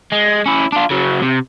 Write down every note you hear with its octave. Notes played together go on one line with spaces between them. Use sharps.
G#3
C#4 E4
D4 F4
C#3 F#3
C3